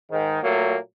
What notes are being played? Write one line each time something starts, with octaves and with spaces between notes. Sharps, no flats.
G#2 D#3
A#2 F#3 A3 A#3